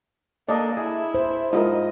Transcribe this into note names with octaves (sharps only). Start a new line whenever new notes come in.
A#3 D4 A4 D5 D#5
E4 G#4
C5
G#2 E4 F4 A#4 D#5